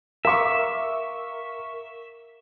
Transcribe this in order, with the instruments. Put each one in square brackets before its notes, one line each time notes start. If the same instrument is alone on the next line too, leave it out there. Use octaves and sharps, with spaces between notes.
[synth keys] A#4 C#6 [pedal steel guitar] E5 [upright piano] F5 D6